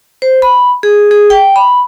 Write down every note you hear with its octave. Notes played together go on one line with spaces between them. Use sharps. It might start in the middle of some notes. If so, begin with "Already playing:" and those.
C5
B5
G#4
G#4
G5
B5